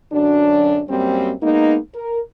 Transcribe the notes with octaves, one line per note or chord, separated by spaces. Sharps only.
F#2 D3 F#3 D4
F#2 G3 A#3 C4
G#3 A#3 B3 D#4
A#4